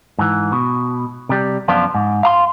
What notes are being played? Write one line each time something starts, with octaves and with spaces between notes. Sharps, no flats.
G#2 E3
B2
C3 G3
F#2 F3 B3 D4 F4
G#2
F5 A#5 C6